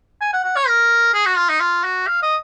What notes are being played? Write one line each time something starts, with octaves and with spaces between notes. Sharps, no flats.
G#5
F#5
F#5
C#5
A#4
G#4
F#4
F4
D#4
F4
F#4
F5
D#5